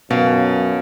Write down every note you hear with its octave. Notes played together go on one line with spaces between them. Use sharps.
F#2 B2 F4